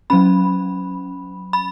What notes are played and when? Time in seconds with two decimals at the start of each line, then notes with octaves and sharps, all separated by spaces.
0.10 F#3 C#4 B5
1.53 B5